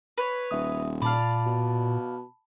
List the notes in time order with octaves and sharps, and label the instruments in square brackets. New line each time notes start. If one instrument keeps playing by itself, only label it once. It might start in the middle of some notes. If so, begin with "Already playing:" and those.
[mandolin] B4 C#5
[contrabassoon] D#1 [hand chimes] E5 D#6
[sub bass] A#2 [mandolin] D5 F5 [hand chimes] A5 B5
[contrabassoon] B2